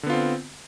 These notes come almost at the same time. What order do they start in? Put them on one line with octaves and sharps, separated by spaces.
D3 B3 F4 C4